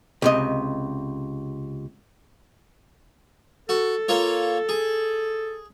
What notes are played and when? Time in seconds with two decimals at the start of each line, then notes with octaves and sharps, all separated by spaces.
0.22 C#2 C3 D#5
3.69 F#4 A4
4.08 A#3 F4 C#5
4.69 G#4